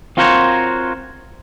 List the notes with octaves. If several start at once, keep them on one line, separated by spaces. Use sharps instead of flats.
C4 F4 F#4 A#4 C5 C#5